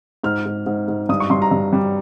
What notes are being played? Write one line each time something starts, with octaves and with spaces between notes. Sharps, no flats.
G#2 F6
G#2
G#2
G#2
G2 D#6
C#6
G2 C6
A#5
G2
G3